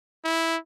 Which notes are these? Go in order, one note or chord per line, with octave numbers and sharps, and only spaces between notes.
E4